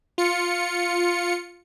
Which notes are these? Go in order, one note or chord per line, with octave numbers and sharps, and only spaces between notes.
F4 C#7